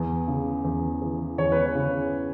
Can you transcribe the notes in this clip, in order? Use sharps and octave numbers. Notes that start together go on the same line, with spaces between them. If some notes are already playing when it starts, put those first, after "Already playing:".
Already playing: E2
C#3
E2
E3
E2 C#5
B4
C#5
C#3